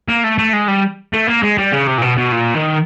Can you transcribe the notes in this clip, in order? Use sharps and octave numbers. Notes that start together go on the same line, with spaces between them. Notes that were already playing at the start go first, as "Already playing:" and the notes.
A#3
A3
A3
G#3
G3
A3
A#3
G#3
G3
C#3
C3
A#2
B2
B2
A#2
D#3